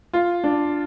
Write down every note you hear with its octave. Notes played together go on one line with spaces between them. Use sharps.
F4
D4